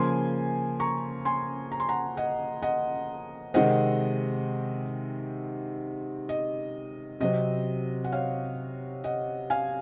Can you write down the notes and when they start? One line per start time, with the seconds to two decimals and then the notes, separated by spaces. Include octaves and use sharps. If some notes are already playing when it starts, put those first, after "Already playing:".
Already playing: C#3 F3 A#3 G#5 C6
0.80 A#5 C#6
1.25 G#5 C6
1.72 A#5
1.80 C6
1.89 F#5 A#5
2.17 D#5 F#5
2.62 D#5 F#5
3.54 C3 D#3 G#3 C4 D#5 F#5
6.29 D#5
7.20 C3 F#3 C4 D#5
8.04 F#5
8.12 C#5 F5
9.04 D#5 F#5
9.50 F5 G#5